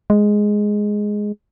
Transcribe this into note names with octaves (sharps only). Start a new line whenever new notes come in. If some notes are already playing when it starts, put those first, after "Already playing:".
G#3